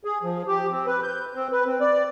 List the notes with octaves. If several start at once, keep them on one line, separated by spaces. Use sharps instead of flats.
G#4
F3
G4
C4
B4
G6
C4
B4
C4
D5